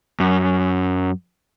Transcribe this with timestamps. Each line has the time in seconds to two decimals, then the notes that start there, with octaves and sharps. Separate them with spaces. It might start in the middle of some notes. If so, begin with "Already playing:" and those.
0.20 F#2